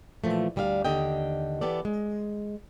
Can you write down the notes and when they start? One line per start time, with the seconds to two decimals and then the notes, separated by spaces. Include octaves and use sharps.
0.24 A#2 E3 F3 A3
0.56 D2 G3 D4 E5 F5
0.85 D#2 D3 G4 D#5 G5
1.61 E3 B3 G4 A4 D5
1.85 G#3